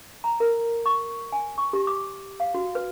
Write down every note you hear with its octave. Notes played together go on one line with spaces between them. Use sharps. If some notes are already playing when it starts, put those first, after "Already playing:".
A#5
A#4
C#6
G#5
C#6
G4
D6
F5
F#4
B4